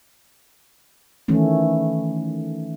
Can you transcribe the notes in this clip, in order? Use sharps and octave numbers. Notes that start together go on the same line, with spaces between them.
D#3 E3 A3 C#4